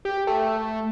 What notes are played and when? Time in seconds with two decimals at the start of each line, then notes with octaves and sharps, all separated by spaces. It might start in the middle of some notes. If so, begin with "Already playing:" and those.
0.05 G4
0.27 A3